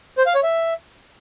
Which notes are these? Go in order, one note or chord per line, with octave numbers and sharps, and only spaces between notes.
C5
F5
C#5
E5